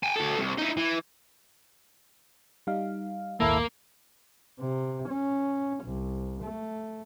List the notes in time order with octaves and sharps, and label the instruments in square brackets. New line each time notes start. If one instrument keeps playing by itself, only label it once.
[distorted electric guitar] G5 G#5
D2 A4
C2
D#4 E4
E3
[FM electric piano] G3 D#4 F5
[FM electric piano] A#1 D#2 G#2 [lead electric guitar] A#3 [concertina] E4 A4
[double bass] C3
C#4
C2
A3